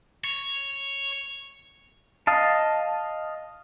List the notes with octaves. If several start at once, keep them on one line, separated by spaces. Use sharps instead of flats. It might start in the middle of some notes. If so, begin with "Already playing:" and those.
C#5
D#5 F5 A5